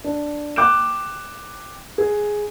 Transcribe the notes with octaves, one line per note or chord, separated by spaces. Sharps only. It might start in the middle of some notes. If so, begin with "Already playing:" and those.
D4
G5 D6 F#6 G6 D7 E7
G#4